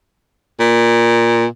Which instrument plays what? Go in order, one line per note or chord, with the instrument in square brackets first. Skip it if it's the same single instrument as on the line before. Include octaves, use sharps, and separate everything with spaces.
[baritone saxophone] A#2